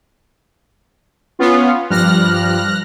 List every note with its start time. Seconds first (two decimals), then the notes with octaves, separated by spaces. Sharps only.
1.39 B3 C#4 F4
1.90 G2 F3 G3 F6 F#6 A#6